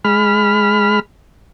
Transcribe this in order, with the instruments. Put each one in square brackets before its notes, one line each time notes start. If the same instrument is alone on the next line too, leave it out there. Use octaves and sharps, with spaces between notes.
[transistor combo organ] G#3 B5 F6